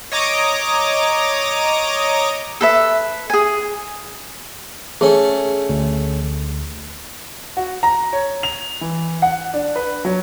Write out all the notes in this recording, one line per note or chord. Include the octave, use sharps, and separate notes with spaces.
C#5 D#5 A#5 D6 D#6
A4 B4 E5
G#4 G#5
A3 C#4 G#4 C#6
D2
F#4
A#5
C#5
F7
E3
F#5
D4
B4
F#3